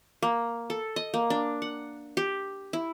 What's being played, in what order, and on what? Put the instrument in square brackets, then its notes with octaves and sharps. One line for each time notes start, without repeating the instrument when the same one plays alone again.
[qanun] A#3
A4
D#5
A#3
D4
F#5
G4
E4